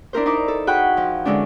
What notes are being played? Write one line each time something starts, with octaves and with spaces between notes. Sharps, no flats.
D4 E4 A#4 C5
D#4 E4 D6
A4
F#4 G#4 F#5 G5 B5 F#6
F3
D3 E3 G#3 C#4 D4